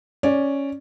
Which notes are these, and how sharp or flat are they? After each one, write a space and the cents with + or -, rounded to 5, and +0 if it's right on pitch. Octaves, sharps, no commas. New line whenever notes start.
C#4 +0 D5 +0